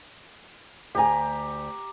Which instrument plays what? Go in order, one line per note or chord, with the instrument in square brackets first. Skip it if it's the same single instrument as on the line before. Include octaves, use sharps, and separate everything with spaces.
[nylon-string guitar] D2 G#5 [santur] G4 A#5